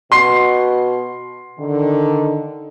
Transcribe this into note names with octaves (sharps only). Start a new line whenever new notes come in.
B2 F#4 C6 C7
D3 D#3